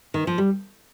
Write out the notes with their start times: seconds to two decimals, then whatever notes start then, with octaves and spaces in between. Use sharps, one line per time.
0.14 D#3
0.27 F3
0.38 G3